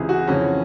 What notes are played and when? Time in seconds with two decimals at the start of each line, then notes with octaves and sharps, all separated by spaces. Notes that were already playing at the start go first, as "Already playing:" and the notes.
Already playing: C#2 C3 E3 G#4
0.09 F#4
0.27 F2 C#3 E3 C#4